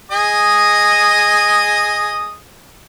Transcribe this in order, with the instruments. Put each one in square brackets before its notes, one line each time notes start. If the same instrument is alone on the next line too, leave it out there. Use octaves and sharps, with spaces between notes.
[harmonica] G#4 D#5 D#6